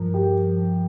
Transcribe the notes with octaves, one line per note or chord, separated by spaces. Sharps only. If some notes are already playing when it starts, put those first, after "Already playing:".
Already playing: G2 F3 A#4
G4